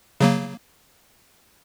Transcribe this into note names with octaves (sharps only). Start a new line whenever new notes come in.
C#3 F#3 A#3